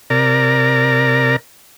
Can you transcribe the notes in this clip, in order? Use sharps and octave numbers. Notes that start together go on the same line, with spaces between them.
C3 A#4 D5 A#5